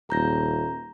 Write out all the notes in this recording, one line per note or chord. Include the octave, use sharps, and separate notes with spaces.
D#1 A#5 G6 A#6